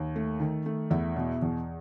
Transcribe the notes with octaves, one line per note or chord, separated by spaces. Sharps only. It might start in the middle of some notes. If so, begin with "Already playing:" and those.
Already playing: D#2
A3
D#3
A3
E2 E4 E5
B2
E2